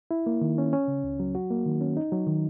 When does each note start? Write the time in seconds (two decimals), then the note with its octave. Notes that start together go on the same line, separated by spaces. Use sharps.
0.11 E4
0.26 A#3
0.41 D#3
0.58 C#4
0.73 C#4
0.88 C#3
1.04 C#2
1.20 F#3
1.35 F#4
1.50 A#3
1.65 D#3
1.81 C#4
1.97 D#4
2.12 F#3
2.27 D#3